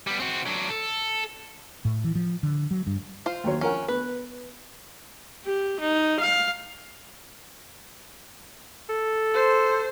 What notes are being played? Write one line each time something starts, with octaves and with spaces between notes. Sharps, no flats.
G3 B3
C4 F#4
F#3 D4
A4
A2
E3
F3
D3
F#3
G2
F4 C5
D#2 F#3 C#5
F3 C#4 A#4 F#5
B3 B4
G4
D#4
F5
A4
C5